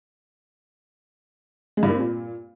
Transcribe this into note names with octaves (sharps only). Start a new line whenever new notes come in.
G#3
G2
A#3
C4
A#2